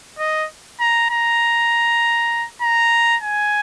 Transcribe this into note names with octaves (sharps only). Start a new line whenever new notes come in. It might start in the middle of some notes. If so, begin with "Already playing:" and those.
D#5
A#5
A#5
A#5
G#5